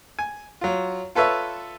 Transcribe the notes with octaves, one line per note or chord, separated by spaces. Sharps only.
G#5
F#3 F4
F4 A4 B4 C#5 E5